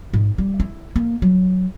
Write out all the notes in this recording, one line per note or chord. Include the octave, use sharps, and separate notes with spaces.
G#2
G3
E4
A#3
F#3